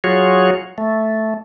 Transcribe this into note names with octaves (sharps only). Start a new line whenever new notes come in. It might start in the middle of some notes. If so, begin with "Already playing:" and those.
F#3 F4 F#4 G#4 C#5
A3